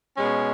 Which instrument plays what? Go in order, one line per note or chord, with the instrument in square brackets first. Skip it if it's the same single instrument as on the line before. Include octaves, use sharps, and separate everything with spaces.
[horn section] B2 G#3 C#4